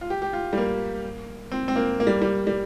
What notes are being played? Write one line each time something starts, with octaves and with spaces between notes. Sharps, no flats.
F4
G4
G4
F4
G3
A#3
C4
C4
A#3
A#3
G3
G3
G3